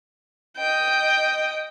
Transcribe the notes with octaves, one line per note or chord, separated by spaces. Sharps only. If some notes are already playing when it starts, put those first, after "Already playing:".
D#5 G5